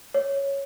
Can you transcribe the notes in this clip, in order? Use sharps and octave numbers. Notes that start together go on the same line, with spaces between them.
C#5